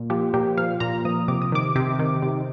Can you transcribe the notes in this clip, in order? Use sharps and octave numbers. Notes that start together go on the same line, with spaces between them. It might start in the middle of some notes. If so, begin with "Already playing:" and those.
Already playing: A#2
F3 G4
A#2 G4
F3 F5
A#2 A#5
F3 D#6
C3 D6
D#6
D#3 D6
C3 D6
D#3
C3